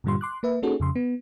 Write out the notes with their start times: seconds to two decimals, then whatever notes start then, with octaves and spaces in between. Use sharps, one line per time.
0.04 G2 A#2 D3 G3 F4 C6
0.21 C6 D6 F#6
0.43 A#3 B4 E5
0.62 A#3 C#4 D#4 F#4 G#4 A4
0.80 F2 C#3 C6
0.96 B3